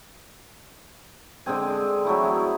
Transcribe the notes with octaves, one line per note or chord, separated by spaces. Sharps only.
D3 G#3 C4 G#5
F#3 A3 E4
G#4